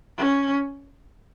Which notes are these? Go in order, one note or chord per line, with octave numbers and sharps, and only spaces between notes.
C#4